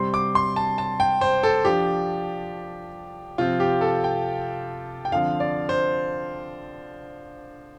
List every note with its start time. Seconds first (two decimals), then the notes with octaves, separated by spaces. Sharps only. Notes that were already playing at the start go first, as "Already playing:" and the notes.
Already playing: C3 G3 C4 C6
0.14 D6
0.35 C6
0.56 A5
0.78 A5
1.00 G5
1.21 C5
1.43 A4
1.65 F3 D4 G4
3.38 C3 F3 C4 F4
3.60 G4
3.81 A4
4.04 G5
5.05 G5
5.12 D3 F3 C4 F5
5.40 D5
5.69 C5